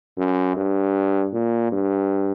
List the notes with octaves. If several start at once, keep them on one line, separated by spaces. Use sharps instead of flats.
F#2
G2
A#2
G2